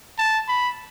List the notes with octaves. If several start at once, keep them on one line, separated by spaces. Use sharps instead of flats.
A5
B5